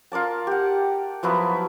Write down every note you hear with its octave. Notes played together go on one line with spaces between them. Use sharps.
F4 A#4 D5 A5
G4 F#5
F3 F#3 B3 E4